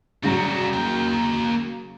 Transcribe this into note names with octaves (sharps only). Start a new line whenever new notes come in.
C#3 F#3 G3 F#4
A#3 G5